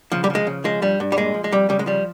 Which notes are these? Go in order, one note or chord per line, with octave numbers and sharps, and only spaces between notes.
C#3 F3
G3
F3
G#3
C#3
F3 G#3
G2 G3
G2
G3
A#2 G#3
F3
G#3
F2 G3
C#3 G3
G#3
F3 G3